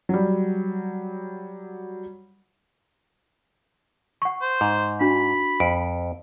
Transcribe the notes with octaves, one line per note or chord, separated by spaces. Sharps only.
F#3 G3
F#5 C#6
C5
G#2
D4 F#4 B5
F2 D7